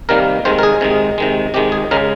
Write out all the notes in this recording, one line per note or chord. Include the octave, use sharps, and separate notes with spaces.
C3 D#3 G3 A#3 A#4
C3 D#3 G#3 C5
A#4
G#4
C3 D#3 G#3
C3 D#3 G#3
C3 D#3 G#3 G4
G#4
C#3 G#3 A#4